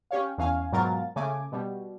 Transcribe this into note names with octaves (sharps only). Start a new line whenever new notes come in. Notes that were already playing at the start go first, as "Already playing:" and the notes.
C#4 G4 C#5 F5
E2 C#4 F5 G#5
G#2 B2 F#3 F4 A#4 A6
C#3 A3 G#5 D6
B2 G3